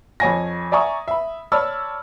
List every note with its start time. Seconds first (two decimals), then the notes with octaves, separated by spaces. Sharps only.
0.20 F2 C#5 G#5 A#6
0.72 D5 E5 G#5 A#5 C#6 D#6
1.08 E5 B5
1.52 C#5 D5 A5 B5 E6 F6